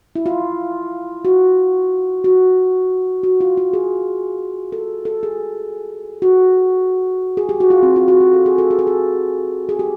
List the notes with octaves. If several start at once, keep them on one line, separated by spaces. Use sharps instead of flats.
E4
F4
F#4
F#4
F#4
F4
F4
G#4
A4
A4
G#4
F#4
G#4
G4
F#4
F4
C4
F4
F#4
G4
A4
G#4
A4
G#4
A4
G#4
G#4
G4